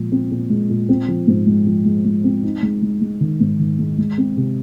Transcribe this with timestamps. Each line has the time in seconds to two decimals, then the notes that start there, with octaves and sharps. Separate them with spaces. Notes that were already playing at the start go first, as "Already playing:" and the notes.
Already playing: A#2 F3 G#3
0.12 C4
0.31 A#2
0.50 G#3
0.70 A#2
0.89 C4
1.08 F3
1.27 G#2
1.47 G#3
1.66 F3
1.85 G#3
2.05 G#3
2.24 C4
2.44 D#4
2.63 G#3
2.82 G#3
3.01 G#3
3.21 D#3
3.40 G#2
3.59 D#3
3.79 G#3
3.98 G#3
4.18 C4
4.37 C3